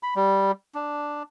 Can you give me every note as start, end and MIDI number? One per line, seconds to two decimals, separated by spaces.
0.03 0.14 83
0.16 0.51 55
0.75 1.23 62